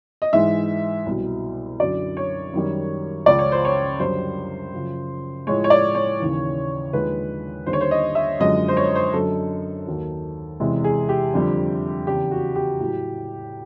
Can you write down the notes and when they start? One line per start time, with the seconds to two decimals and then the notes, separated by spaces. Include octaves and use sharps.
0.22 D#5
0.33 G#2 E3 G#3 E5
1.06 C2 B2 F#3
1.79 F#2 D3 F#3 D5
2.17 C#5
2.53 F#2 D#3 G3
3.26 C#2 C#3 F3 D5
3.39 C#5
3.52 C5
3.65 C#5
3.99 F#2 D3 G3 C5
4.73 F#2 C#3 F3
5.47 A2 F3 G#3 C#5
5.64 C#5
5.70 D5
5.95 C#5
6.20 D#2 C#3 E3
6.93 D#2 D3 F3 G#3 B4
7.66 D#2 D3 G3 C5
7.73 C#5
7.81 C5
7.91 D#5
8.15 E5
8.40 F#2 D3 F3 G#3 D#5
8.68 C5
8.77 C#5
8.95 C5
9.13 F#2 D3 F#3 A4
9.87 D#2 D#3 F#3
10.60 E2 C3 E3 G#3
10.84 G#4
11.09 G4
11.34 F2 D3 G3
12.07 E2 C#3 E3 G4
12.31 F#4
12.55 G4
12.80 A2 F#3